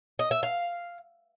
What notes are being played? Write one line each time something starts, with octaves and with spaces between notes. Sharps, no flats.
D#5
E5
F5